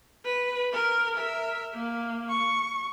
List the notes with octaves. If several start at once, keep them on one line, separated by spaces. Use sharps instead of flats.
B4
A#4
A#4 E5
A#3
C#6